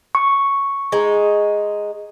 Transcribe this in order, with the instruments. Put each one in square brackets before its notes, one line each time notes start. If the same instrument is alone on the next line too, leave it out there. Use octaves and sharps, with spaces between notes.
[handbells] C#6
[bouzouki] G#3 D#4